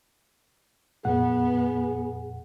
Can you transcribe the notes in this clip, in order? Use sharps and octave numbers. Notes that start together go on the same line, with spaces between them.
F2 A#2 B3 G#4 F#5